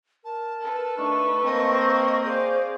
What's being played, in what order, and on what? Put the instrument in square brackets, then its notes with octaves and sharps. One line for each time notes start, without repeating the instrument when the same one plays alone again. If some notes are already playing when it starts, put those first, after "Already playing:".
[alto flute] A#4 [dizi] A5
[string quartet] A4 B4
[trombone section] A3 D4 D#4 [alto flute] C#6
[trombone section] A#3 C4 [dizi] D#5
[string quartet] G#4 D5 F5 [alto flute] C5